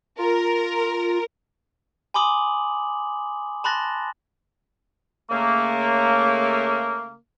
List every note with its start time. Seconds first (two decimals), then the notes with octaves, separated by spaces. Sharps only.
0.18 F4 A#4
2.14 G#5 B5 C6 D6 D#6 F#7
3.64 A5 B5 C6 F#6 A6 A#6
5.31 C#3 A3 A#3